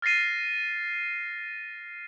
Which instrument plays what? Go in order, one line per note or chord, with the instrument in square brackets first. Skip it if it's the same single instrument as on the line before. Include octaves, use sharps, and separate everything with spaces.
[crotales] F6 A6 A#6 C7 D#7